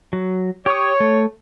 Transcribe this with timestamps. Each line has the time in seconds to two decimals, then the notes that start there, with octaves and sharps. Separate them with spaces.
0.13 F#3
0.66 G4 C#5 D#6
1.00 A3